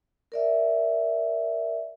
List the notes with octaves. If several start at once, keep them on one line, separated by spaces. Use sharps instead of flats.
A#4 D5 E5